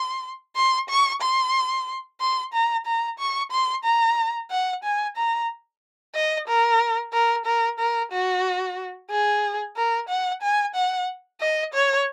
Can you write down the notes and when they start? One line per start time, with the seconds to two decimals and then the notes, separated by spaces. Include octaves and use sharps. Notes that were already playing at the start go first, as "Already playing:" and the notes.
Already playing: C6
0.56 C6
0.89 C#6
1.22 C6
2.21 C6
2.53 A#5
2.86 A#5
3.19 C#6
3.52 C6
3.85 A#5
4.51 F#5
4.84 G#5
5.17 A#5
6.15 D#5
6.48 A#4
7.13 A#4
7.46 A#4
7.79 A#4
8.12 F#4
9.11 G#4
9.77 A#4
10.09 F#5
10.42 G#5
10.75 F#5
11.41 D#5
11.74 C#5